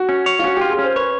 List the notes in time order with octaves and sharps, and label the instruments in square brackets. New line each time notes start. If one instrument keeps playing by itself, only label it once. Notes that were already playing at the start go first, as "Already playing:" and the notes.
Already playing: [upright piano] F#4
[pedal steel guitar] C#4
C#5
[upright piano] F4
[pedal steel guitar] C#4 [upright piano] F#4
[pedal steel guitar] F4 [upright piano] G4
[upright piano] G#4
[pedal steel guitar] C#4 [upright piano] C5
[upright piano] B4 [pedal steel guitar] C#5